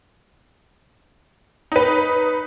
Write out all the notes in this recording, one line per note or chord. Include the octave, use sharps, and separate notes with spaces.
D#4 B4